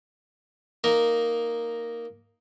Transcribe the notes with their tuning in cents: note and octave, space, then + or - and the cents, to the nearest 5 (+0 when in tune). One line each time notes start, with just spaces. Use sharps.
A#3 +0 D#4 +0 A#4 +0